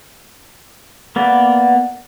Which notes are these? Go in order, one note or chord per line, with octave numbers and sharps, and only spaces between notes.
A#3 B3 D5